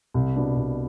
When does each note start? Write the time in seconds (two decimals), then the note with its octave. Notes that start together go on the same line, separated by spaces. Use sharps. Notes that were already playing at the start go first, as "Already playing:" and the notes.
0.14 C2
0.36 B2 B3 D4
0.56 C2